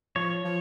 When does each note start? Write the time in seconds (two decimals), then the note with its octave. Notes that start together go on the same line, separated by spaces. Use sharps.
0.15 F3 C#5
0.44 F3